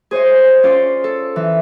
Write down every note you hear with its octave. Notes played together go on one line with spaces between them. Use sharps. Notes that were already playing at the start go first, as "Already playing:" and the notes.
G#4 C5 C#5 D#5
C#4 F4 D5 C6
A4
E3